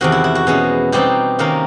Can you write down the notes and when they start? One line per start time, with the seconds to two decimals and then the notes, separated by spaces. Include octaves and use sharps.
0.01 E2 C3 D#3 F#4
0.12 E4
0.24 E4
0.35 F#4
0.47 B2 G#3 C#4
0.92 B2 G3 C4 D#4 G4
1.39 C3 D#3 G3 A#3 C#4